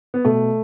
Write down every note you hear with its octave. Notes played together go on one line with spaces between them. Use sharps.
B3
B2 A3